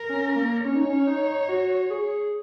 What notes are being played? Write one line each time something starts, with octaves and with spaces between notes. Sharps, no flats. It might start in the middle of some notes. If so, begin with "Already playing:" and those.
Already playing: A#4
C#4
A#3
C#4 C#5
D#4
C#4
D#4
F#4
G#4